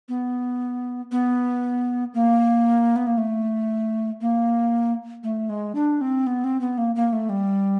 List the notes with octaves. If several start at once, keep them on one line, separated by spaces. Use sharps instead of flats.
B3
B3
A#3
B3
A#3
A3
A#3
A3
G#3
D4
C4
B3
C4
B3
A#3
A#3
A3
G3